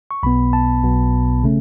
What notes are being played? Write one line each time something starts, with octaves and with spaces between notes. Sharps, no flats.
C#6
B1 B2 B3 B5
A5
B1 B2 B3
C#3 A3 C#4